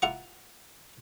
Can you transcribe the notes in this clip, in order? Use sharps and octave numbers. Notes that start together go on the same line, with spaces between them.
E4 F4 F#5 A#5 D6